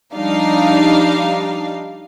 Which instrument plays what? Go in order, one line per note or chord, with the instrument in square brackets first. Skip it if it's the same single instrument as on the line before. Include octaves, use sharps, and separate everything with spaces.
[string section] F3 G3 D4 D#4 F5